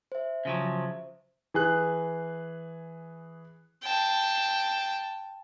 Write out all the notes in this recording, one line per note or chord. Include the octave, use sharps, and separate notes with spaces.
C5 E5
C#3 F3 F#3
E3 G#4 F#6
G5 A5